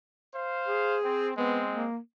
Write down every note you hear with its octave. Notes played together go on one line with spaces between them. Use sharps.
C5 F5
G#4
C4
G#3 B3 C4
A#3